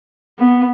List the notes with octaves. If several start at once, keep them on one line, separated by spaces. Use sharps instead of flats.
B3